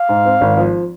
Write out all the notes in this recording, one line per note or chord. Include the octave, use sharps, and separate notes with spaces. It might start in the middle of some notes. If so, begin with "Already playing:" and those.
Already playing: F5
G#2
C4
G#1
F3